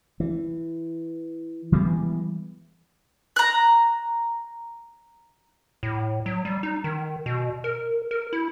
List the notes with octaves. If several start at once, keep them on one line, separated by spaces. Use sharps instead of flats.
E3
E3 G3 G#3 B3
A#5 F#6
A2
F#3
G3
D#4
D#3
B2
A#4
A#4
E4